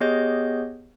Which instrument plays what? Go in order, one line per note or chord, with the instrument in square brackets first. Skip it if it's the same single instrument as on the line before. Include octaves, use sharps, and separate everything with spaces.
[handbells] B3 G4 G#4 C#5 D#5 G6